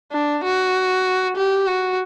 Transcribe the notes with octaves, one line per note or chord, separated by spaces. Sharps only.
D4
F#4
G4
F#4